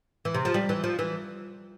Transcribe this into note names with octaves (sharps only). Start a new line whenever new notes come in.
E3
C3
F3
G3
E3
F3
E3